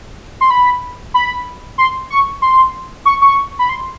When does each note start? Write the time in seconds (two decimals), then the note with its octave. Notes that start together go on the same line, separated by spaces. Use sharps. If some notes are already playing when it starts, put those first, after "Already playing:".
0.41 C6
0.50 B5
1.14 B5
1.78 C6
2.10 C#6
2.42 C6
3.05 C#6
3.22 C#6
3.59 B5
3.69 C6